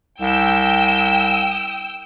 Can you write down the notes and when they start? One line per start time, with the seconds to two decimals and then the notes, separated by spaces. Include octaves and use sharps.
0.21 C2 G5 E6